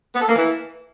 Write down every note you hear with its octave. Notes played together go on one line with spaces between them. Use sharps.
B3
A4
A#3
E3